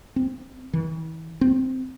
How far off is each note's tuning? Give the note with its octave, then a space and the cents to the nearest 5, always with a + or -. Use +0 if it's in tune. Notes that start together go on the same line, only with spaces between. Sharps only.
C4 +10
E3 -35
C4 -5